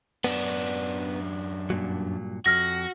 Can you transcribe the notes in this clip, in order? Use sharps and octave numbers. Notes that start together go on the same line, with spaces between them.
F#2 B3 D4
G2 A#2 F#3
F2 F#4 F6 A#6